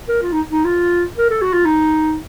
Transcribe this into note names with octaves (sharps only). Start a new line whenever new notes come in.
A#4
F4
D#4
D#4
F4
A#4
A4
F#4
F4
D#4